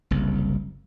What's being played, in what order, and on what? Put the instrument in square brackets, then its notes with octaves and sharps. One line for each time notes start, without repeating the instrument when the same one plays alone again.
[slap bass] F#1 C2